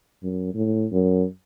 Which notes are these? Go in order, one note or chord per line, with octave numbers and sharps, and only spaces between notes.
F#2
A2
F#2